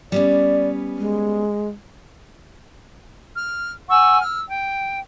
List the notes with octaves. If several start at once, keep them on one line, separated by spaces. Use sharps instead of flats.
G3 B3 C#4 D5
G#3
F6
F#5 G#5 C#6 E6
E6 F6
G5